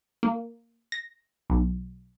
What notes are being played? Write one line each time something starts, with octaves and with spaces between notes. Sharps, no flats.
A#3
A#6
B1